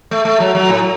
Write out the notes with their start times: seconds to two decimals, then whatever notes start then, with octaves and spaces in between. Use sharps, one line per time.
0.11 A3
0.25 A3
0.40 F#3
0.55 F#3
0.69 A2